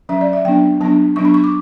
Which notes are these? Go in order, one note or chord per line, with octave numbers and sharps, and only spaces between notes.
F#3 C#4 E5
D5
E5
F#3 B3 D4 G5
F#3 B3 D4 A5
F#3 B3 D4 C#6
B5
C#6
D6